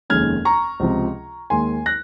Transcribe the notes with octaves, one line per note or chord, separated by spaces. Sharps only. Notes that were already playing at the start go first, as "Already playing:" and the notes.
F1 D#2 D#3 G#3 C#4 F6 G#6
A#5 C#6
C#2 C3 F3
D#2 D#3 G#3 G#5 C6
F#6 A#6